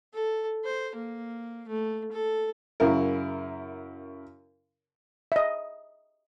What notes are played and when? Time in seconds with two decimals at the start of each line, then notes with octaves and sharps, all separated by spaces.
0.14 A4
0.65 C5
0.95 A#3
1.68 A3
2.12 A4
2.80 F#2 C#3 E4 A#4
5.32 D#5 E5